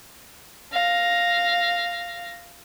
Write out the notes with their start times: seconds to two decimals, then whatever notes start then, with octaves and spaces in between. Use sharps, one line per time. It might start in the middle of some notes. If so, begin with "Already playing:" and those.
0.72 F5 A#6